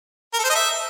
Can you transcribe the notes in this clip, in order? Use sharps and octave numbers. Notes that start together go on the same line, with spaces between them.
A#4
A4
C5
D#5
E5